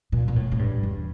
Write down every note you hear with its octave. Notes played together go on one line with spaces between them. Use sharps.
A#2
A#2
A2
A2
G2
E2